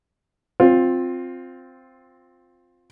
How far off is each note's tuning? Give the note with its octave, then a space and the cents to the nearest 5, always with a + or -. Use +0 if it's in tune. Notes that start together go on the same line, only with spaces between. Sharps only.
C4 +0 F4 +15